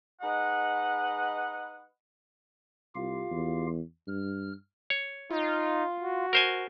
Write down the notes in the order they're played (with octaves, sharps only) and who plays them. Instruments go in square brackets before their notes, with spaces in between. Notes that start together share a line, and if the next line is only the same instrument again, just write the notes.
[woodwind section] G#3 D#4 B4 D#5 F#5
[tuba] C2 [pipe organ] F4 G4 F5
[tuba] E2
[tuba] G2 [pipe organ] F6
[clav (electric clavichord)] C#5
[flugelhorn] D#4 [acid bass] F4
[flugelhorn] F#4
[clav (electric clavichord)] A#4 C5 G#5